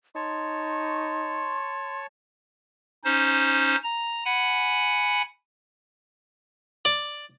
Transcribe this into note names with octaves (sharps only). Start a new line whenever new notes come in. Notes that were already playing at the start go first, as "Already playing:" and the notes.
D#4 C#5 A5 C6 C#6
C#4 D#4 C5
A#5
F#5 G#5 B5
D5